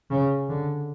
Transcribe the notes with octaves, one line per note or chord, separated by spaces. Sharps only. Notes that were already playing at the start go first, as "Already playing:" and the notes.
C#3
D3